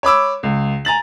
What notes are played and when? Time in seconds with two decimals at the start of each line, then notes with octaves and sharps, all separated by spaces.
0.03 C#5 B5 D6 E6
0.43 C#2
0.85 G#5 A#5 A6 F#7